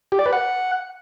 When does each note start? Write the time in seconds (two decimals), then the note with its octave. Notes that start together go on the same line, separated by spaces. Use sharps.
0.12 G4
0.19 D5
0.26 B4
0.33 F#5